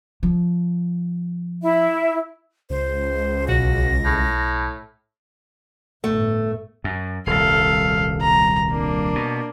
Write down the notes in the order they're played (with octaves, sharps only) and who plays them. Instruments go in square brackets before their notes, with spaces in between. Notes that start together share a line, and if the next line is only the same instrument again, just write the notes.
[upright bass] F3
[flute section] E4 E5
[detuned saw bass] C#2 [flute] C5
[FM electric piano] B1 [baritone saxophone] F#4 [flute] A#6
[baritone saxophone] A2
[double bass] G1 A2 [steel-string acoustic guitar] A3
[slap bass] F#2
[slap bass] D#1 C2 [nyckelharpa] A4 F5
[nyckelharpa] A#5
A#3 D4
[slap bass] B2